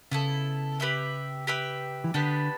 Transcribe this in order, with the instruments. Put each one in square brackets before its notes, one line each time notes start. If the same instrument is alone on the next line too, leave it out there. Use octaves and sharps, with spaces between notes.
[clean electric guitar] C#3 [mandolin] B3 E4 A4
[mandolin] G4 B4 E5 G5
G4 B4 E5 G5
[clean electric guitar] E3
[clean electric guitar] D3 [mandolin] B3 D4 G4 B4